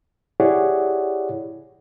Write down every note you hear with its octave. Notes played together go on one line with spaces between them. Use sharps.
E4 G4 G#4 C#5 D5 F#5